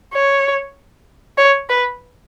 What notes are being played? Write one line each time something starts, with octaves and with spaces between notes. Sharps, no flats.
C#5
C#5
B4